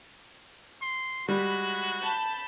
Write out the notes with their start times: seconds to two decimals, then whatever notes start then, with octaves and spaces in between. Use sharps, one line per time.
0.81 C6
1.29 G3 G#3 F#4 B5
2.00 A5 B5 G6